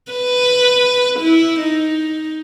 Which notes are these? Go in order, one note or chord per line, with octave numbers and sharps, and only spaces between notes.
B4
E4
D#4